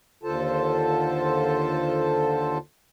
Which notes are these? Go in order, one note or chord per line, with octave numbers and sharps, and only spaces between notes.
D#2 D3 F4 A4 C5 A5